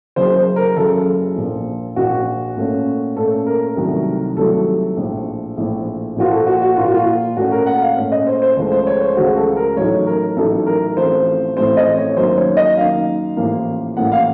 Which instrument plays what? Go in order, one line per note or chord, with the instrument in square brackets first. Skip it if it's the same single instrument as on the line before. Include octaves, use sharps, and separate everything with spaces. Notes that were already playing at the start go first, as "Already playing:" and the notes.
[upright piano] F#1 F#2 C#3 C5
C5
A#4
F#1 F#2 C#3 A4
A#1 A#2 F3
A#1 A#2 F3 F#4
A#2 A3 C#4
A#2 A3 C#4 A4
A#4
C2 C3 D#3 F#3 A3
C2 C3 D#3 F#3 A3 A4
A#1 A2 F3
A#1 A2 F3
A#2 F3 A#3 F4 F#4
A4
F#4
F#4
A#2 F3 A#3 F4
F#4
F4
A#2 A3 C#4 F#4
A#4
F#5
F5
A#2 A3 C#4
D#5
C5
C5
C#2 C#3 F3 A3 C5
C5
C#5
C5
C#2 C#3 F3 A3 F#4
A4
A#4
A1 A2 F#3 A3 D#4 C#5
A#4
A1 A2 F#3 A3 D#4 A4
A#4
A1 A2 F3 A3 C4 C5
A1 A2 F3 A3 C4 C5
D#5
C#5
F#2 D#3 A#3 D#4 C5
C#5
D#5
F#2 D#3 A#3 D#4 F5
A1 A2 F3 A#3
A1 A2 F3 A#3 F#5
F5